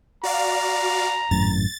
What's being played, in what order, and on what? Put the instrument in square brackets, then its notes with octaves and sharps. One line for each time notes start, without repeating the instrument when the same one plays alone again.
[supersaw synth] F#4 D5 F5 [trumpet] A#5
[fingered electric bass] G#1 F#2 A2 [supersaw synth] A6